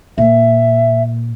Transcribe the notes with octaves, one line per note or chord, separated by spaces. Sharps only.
A#2 E5